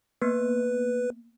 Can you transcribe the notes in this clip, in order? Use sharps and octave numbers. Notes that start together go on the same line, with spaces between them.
A#3 B3 B4